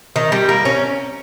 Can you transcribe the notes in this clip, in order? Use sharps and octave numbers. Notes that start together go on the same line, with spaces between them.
D#3
G3
A#3
C#4